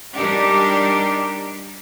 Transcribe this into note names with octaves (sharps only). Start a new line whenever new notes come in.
G3 D4 D#4 G4 A#4 D5